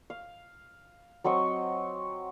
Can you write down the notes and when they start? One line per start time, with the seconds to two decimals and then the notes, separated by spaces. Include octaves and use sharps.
0.10 F5
1.24 F#3 C4 D#5 C#6